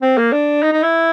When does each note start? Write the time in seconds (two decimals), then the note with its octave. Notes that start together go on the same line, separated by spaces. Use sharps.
0.02 C4
0.17 A#3
0.32 D4
0.62 D#4
0.73 D#4
0.83 E4